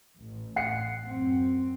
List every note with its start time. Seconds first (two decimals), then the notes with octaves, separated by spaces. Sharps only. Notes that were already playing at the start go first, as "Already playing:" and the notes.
0.18 A1
0.56 F#5 C7 C#7
1.05 F#2 C4